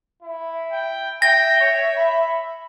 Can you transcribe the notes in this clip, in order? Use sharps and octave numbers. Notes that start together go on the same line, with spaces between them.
E4
G5
E5 G5 A#6
C#5
B5